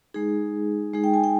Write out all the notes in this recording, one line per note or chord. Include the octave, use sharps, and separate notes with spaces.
G#3 D#4 G#4
G#3 D#4 G#4
G5
G#5
G5